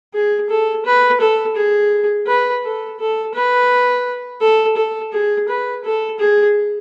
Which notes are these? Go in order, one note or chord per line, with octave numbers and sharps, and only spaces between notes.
G#4
A4
B4
A4
G#4
B4
A4
A4
B4
A4
A4
G#4
B4
A4
G#4